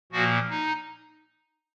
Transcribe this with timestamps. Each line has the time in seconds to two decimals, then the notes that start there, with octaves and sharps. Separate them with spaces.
0.12 A#2 F3 A#3 F#4
0.50 D#4